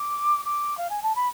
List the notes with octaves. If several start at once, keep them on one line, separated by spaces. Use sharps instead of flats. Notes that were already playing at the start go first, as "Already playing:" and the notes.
Already playing: D6
D6
F5
G#5
A5
B5